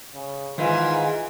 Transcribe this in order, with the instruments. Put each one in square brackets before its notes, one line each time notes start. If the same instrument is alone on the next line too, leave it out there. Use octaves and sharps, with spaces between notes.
[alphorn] C#3
[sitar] G#2 E3 [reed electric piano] D#3 B4 [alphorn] F4